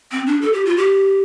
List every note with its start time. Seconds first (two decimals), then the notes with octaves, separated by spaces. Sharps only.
0.12 C4
0.27 D4
0.42 A4
0.53 G4
0.65 F4
0.77 G4